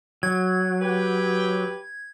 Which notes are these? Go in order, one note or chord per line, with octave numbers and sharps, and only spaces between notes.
F#3 G#6
G4 B4 G5